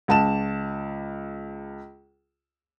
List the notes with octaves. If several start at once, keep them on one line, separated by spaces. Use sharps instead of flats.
C#2 A5 E7